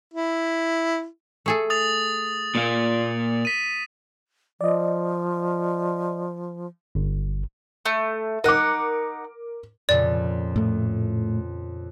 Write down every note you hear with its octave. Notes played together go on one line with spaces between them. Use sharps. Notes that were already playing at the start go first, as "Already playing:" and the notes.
E4
A3 G#4 A4
D#6 A6 F7
A#2 A#3
B6 D#7
F3 D5 D#5
G1
A3
D#4 A#4 F#5 D6
F2 A#2 C#3 D5
A2 A3